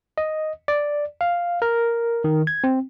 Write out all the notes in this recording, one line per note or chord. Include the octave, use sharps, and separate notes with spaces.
D#5
D5
F5
A#4
D#3
G#6
C4